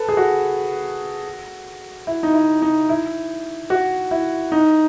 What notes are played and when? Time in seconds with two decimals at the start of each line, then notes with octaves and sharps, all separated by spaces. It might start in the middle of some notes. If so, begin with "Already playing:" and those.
Already playing: A4 B4
0.09 G#4
0.17 F#4
2.07 E4
2.23 D#4
2.34 E4
2.62 D#4
2.89 E4
3.70 F#4
4.11 E4
4.52 D#4